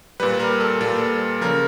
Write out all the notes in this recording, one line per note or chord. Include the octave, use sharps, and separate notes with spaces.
A#2 G3 B4
A#4
A4
A#2 G3 A4
C#3 F3 A#4